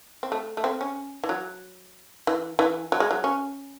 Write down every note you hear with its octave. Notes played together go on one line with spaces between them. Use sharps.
C4
A3
A3
C4
C#4
E3
F#3
E3
E3
F#3
G#3
F#3
C#4